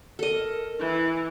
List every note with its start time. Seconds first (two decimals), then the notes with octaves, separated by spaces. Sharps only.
0.19 A4 A#4 D#5
0.80 E3 E4